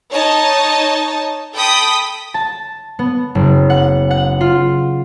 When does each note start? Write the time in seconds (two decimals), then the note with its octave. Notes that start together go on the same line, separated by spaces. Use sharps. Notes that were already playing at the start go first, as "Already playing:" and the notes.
0.11 D#4 C#5 D#5 A5
1.53 A4 G5 B5 D#6 B6
2.34 A5
2.99 B3
3.35 F#1
3.70 F#5
4.11 F#5
4.41 F4